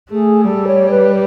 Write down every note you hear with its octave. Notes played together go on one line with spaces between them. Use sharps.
A3 G#4
G3 A4
C#5
B4